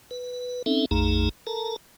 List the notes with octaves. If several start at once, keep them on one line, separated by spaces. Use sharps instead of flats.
B4
C4 C#4 D#4 A4 E5
A#1 F2 A3 D#4 G#4 A#5
A4 A#4 A5 A#5